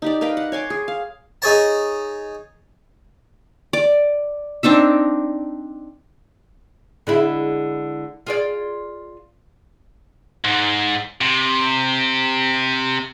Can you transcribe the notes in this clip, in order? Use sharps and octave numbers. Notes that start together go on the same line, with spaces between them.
D#4 G4 D5
A#4 B4 F5 G5
F#5
C#5 G#5 C6 D6
G#4
F5
D#4 G#4 C#5 A5
D5
C4 D4 D#4 E5
D3 G#3 E4
F4 G#4 D5
G#2
C3